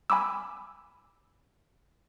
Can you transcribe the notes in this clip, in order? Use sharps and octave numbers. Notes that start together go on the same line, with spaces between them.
G#5 B5 D6 E6